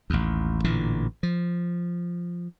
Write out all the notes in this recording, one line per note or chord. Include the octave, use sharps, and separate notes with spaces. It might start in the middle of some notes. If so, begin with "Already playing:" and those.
A1 D#2
A1 A#2 D3 E3
F3